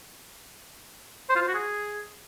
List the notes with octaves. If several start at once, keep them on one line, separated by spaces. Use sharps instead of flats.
C5
F4
C5
F#4
G#4